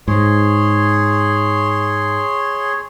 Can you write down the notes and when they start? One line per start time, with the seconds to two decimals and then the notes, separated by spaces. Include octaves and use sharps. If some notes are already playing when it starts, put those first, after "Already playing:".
0.08 G#2 G#4 C#5 C6